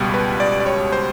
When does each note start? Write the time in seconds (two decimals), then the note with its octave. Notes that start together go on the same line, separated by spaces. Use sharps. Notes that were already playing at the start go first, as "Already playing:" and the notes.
Already playing: C#2 B2 G3
0.14 B4
0.40 D5
0.60 D5
0.66 C#5
0.92 C5